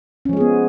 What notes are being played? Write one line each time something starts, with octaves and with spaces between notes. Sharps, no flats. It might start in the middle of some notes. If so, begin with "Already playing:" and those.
F3 G#3 B3 C#4 G#4